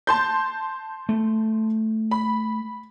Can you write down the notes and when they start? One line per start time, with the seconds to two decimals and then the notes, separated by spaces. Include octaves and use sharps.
0.07 A5 C6 G6
1.09 A3
2.11 B5